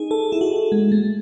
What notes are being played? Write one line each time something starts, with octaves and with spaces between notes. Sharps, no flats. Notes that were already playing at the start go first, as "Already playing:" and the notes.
Already playing: D#4 G#4
A4
E4
F#4
G#3
A3